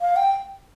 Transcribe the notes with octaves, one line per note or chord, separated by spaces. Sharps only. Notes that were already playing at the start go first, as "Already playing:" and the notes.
F5
G5